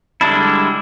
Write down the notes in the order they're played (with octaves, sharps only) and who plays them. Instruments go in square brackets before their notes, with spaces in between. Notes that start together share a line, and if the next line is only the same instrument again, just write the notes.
[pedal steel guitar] D3 G3 G#3 D4 E4